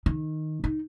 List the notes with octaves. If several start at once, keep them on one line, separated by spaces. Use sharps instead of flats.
D#3
D#4